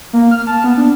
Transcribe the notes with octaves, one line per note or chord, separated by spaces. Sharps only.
A#3
F6
A5
B3
D4